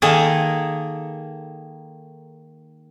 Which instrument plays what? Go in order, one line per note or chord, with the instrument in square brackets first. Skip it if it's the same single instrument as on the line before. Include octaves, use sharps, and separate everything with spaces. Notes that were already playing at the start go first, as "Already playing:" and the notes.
[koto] D#3 A#3 G#4 A4